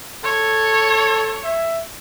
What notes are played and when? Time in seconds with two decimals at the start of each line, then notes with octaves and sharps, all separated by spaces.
0.24 A4 C#5
1.44 E5